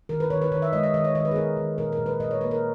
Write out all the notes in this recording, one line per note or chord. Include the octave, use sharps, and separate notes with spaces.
D#3 A#4
B4
D#3 C#5
B4
D#3 C#5
E5
G#3 D#5
D#5
D#3 D#5
C#5
D#3 D#5
B4
G#4
B3 A#4
D#3
A#2 A#4
A#4
A#2
B4
A#2 D#5
C#5
A#3 B4
A#4